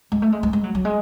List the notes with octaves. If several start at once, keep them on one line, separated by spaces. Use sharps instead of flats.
G#3
A3
G#3
G#3
G#3
F#3
F#3
G#3